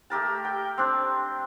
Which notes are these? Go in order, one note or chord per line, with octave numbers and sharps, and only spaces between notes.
A3 G4 A#4 A5
G5
C4 D4